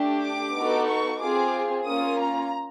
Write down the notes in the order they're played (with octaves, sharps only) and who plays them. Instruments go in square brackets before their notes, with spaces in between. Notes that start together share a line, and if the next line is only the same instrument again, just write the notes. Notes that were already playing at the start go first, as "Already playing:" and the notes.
Already playing: [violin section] A3 D4 G4
D6
B3 D#4 F#4 A4
C#6
C4 F4 G#4 D6
A#3 C#4 F4 D#6
A#5